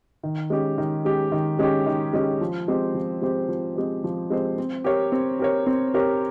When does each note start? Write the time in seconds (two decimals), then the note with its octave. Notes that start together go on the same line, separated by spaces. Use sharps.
0.23 D#3
0.50 G#3 C#4 G4
0.78 D#3
1.05 G#3 C#4 G4
1.32 D#3
1.59 G#3 C#4 G4
1.86 D#3
2.13 G#3 C#4 G4
2.41 F3
2.68 G#3 C4 G4 C5
2.94 F3
3.22 G#3 C4 G4 C5
3.49 F3
3.76 G#3 C4 G4 C5
4.04 F3
4.30 G#3 C4 G4 C5
4.58 C4
4.84 G4 A#4 C#5
5.12 C4
5.39 G4 A#4 C#5
5.66 C4
5.94 G4 A#4 C#5